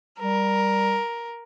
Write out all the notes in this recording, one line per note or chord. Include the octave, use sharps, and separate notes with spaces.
G3 A#4